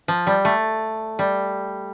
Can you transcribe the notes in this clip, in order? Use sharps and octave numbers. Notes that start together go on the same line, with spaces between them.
F3
G3
A3
G3